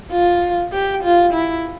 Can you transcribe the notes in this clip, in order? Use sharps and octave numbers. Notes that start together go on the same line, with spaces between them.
F4
G4
F4
E4